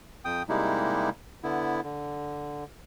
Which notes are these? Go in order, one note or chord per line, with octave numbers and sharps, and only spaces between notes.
F2 G5 D#6
C3 G3 G#3 A#3 D#4 E4
D3 B3 E4
D3